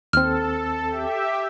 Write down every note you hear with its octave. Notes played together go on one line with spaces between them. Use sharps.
D#2 C4 A4 F6
G4 E5